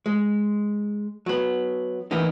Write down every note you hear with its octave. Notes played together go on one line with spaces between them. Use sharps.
G#3
F#3 B3
E3 A#3 B3 D#4